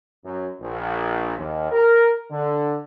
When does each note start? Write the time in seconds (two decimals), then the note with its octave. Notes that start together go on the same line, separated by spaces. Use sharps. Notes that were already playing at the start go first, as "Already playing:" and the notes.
0.24 F#2
0.61 A#1
1.37 D#2
1.71 A#4
2.31 D3